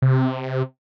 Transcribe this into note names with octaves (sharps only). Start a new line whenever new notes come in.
C3